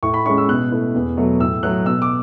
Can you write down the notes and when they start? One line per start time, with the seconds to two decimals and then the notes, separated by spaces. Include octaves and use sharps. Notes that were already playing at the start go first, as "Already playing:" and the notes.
0.03 A2 C#6
0.14 B5
0.26 G#3 C#4 E4 C#6
0.38 E6
0.48 B2 F#6
0.71 A3 E4
0.95 E2
1.17 B2 F#3 A3
1.40 A2 E6
1.63 F#3 A3 F#6
1.85 B2 E6
2.02 D6